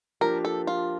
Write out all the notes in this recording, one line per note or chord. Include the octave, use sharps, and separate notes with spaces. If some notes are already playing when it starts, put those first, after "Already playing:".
F3 A#3 D4 G4 A#4
A4
F4